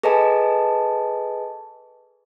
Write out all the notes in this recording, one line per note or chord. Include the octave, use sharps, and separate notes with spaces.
G#4 A4 B4 D#5 G#5 A5